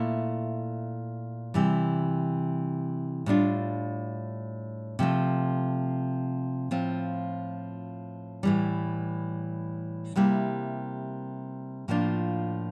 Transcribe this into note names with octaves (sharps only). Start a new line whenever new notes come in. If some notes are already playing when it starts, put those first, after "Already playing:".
Already playing: A#2 A3 E4
C3 E3 G3
A2 G3 D4 F4
C3 F3 A3
A2 F3 C4 F4
A2 E3 G3
C3 G3 A#3 E4
A2 F3 A#3 D4 F4